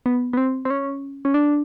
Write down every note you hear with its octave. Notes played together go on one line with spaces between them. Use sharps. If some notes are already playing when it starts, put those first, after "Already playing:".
B3
B3
C4
C4
C#4
C#4
D4